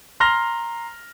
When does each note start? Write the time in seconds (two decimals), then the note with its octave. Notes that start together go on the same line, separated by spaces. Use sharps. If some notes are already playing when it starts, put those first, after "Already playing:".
0.20 A#5 C6 F6 A#6 F7 G7